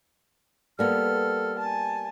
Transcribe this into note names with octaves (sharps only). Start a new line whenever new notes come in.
G3 A#3 B3 A4 F6
G#5 A5